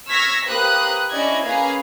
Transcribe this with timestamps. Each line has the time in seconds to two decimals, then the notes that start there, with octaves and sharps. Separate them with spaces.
0.10 C#6 E6 F6 G#6 A#6 B6
0.48 A#3 G4 B4 C5 D#6 F#6
1.14 C#4 D4 E4 D5 D#5 G#6
1.46 A#3 C#4 G#4 B4 F5